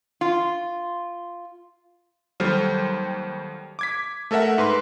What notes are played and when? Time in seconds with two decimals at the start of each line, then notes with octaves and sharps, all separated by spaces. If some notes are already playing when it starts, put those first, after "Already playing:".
0.21 F4
2.40 D#2 F#3 G3 A4 C5 F6
3.79 D6 G#6 B6
4.31 A3 A4 A#4 E5 F#5
4.58 G#2 B4 C6